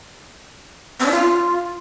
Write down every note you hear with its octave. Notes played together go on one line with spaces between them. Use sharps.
C4
D4
F4